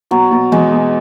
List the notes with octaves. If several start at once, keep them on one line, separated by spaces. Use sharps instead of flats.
B2 F#3
B2
E2 G#3
B2